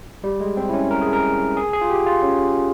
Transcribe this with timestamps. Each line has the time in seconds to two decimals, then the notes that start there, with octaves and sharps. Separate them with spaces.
0.24 G3
0.40 G#3
0.57 C4
0.69 E4
0.73 C#4
0.91 A#4
1.01 G#4
1.13 A#4
1.57 G#4
1.73 G#4
1.81 F4
1.90 G4
2.06 F4
2.22 C#4